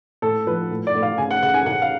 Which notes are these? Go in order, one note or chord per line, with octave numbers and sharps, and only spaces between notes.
A2 A4
F3 B4
A2
D5
A2
F5
C#3 G#5
F#5
C#3 F#5
G#5
C#3 F#5
F5